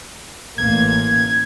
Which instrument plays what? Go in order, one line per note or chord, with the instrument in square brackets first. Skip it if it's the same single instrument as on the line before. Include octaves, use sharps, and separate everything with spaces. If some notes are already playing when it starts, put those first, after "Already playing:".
[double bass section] A1 A#3 [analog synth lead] G#6